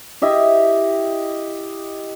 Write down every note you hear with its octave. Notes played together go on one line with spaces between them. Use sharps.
E4 G4 D#5 E5